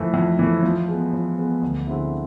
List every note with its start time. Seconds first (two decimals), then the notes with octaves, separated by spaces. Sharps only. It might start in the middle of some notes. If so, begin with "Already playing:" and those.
Already playing: F2 E3 A3
0.14 F2
0.39 E3 A3
0.63 F3
0.88 G#3 B3
1.13 F3
1.38 G#3 B3
1.62 D2
1.87 D3 G#3 C4 E4